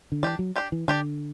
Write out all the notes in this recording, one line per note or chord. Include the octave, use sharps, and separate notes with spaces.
D3
E3 D4 G4 D5
F#3
D4 G4 D5
E3
D3 D4 G4 D5